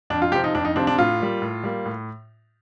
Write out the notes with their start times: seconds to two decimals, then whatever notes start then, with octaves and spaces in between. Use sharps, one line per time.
0.10 F2 D4
0.22 F4
0.32 C3 F3 C4 G4
0.44 D#4
0.55 F2 D4
0.65 D#4
0.76 C3 F3 C4 D4
0.87 D4
0.98 A2 F4
1.20 G3 A#3
1.42 A2
1.64 G3 A#3
1.86 A2